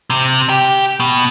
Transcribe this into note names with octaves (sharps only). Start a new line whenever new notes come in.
C3
G4
B2